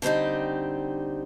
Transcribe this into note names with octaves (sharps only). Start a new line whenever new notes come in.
D3 G3 C4 D#4 G4